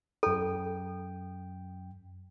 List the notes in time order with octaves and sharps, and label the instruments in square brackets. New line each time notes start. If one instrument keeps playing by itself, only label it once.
[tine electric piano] F#2 G5 [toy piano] A4